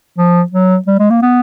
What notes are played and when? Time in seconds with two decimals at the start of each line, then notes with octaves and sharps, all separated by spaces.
0.18 F3
0.52 F#3
0.87 G3
0.99 G#3
1.10 A#3
1.22 B3